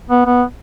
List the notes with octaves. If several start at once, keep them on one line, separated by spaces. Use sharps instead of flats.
B3
B3